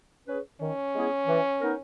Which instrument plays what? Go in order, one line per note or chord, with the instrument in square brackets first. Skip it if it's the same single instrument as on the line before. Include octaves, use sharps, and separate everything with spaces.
[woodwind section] C#4 G#4 B4
[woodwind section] D#3 [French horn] C#4
[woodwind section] G#3 B3 E4 G#4
E3
B3 D#4 A#4